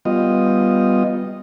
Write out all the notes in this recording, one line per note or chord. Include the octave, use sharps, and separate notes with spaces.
G3 B3 F4 D#5